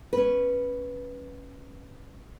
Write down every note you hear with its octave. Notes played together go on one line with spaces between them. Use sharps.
C#4 B4